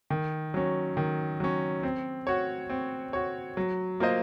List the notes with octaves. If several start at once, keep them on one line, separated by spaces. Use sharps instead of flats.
D#3
F#3 C#4
D#3
F#3 C#4
C4
F#4 C#5
C4
F#4 C#5
F#3
A#3 F4 C5 D#5